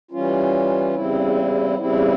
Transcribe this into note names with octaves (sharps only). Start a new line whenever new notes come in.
E3 G3 C#4 F4
E2 C#3 G3 C4 E4
E2 C#3 G3 C4 E4